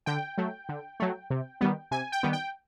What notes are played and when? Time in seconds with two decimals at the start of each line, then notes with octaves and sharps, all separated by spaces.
0.06 D3 G5
0.38 F#3 A3
0.69 D3
1.00 F#3 A3
1.30 C3
1.61 D#3 G3 B3
1.91 C3 G#5
2.12 G5
2.23 D#3 G3 B3
2.33 G5